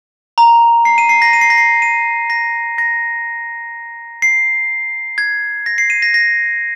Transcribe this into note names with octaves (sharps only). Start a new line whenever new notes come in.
A#5
C7
D#7
C7
A#6
D#7
C7
A#6
C7
D#7
A#6
A#6
C7
G#6
A#6
C7
D#7
A#6
A#6